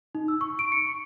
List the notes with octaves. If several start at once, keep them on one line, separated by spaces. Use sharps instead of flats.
D#4
E6
C#6
D7
C#7
C#6